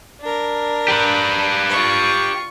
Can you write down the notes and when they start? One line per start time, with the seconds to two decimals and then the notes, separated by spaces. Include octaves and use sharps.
0.21 D4 A#4
0.88 G4 B4
1.70 F4 C#6